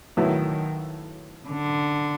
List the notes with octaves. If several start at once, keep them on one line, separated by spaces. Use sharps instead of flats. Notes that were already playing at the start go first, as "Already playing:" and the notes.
B1 A2 D#3 F#3 B3 E4
D3